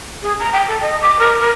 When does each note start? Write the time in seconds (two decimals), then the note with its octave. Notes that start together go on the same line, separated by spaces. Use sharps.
0.22 G#4
0.39 A#5
0.53 G5
0.68 A4
0.81 D#5
1.01 D6
1.19 A#4
1.40 A#4